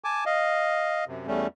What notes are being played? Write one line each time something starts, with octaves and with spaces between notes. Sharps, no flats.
G#5 A5 D6
D#5 F5
F#2 C3
E2 G3 A3 C#4